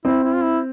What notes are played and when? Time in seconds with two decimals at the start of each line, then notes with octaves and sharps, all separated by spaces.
0.05 C4 E4
0.24 E4
0.35 F4
0.43 E4